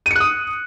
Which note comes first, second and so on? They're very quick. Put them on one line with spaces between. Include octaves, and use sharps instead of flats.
D#7 C#7 F#6 D#6